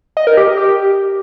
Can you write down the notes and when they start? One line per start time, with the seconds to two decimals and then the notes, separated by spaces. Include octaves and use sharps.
0.17 D#5
0.27 A#4
0.37 G4
0.48 D#5
0.58 G4